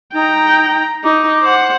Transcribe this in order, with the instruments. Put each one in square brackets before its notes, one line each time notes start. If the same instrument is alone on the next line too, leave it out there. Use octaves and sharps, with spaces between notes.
[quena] D#4 [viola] G5 A#5
[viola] D#4 [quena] D6
[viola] C5 F#5